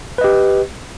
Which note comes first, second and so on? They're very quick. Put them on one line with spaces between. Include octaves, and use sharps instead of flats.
B4 D#5 G4